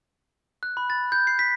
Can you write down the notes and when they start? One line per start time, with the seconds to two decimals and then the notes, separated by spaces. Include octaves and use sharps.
0.63 F#6
0.77 B5
0.90 A6
1.12 G6
1.27 C7
1.39 B6